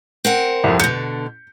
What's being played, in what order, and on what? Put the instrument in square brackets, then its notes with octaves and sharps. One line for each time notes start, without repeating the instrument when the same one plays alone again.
[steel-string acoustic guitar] C4 A#4 F#5
[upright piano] C2 F2
[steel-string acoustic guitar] B2 D3 [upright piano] G6 C#7